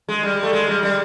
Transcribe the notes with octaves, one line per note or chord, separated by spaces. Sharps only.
G#3
G3
A3
G#3
G3
G3